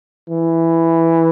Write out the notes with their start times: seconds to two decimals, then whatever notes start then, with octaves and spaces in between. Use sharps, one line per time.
0.29 E3